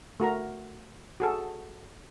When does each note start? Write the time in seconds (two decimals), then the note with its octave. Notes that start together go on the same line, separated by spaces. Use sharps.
0.20 A3 F#4 A#4 A#5
1.20 F#4 G#4 A4